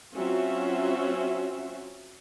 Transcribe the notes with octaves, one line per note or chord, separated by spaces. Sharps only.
F#3 C4 C#4 F4 F#4 E5